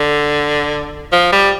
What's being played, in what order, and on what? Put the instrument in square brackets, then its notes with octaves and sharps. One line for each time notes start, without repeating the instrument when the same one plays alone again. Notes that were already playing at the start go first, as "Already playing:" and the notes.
Already playing: [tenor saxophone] D3
F3
G3